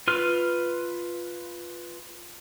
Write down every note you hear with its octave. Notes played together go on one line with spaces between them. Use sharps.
F4 B4 F6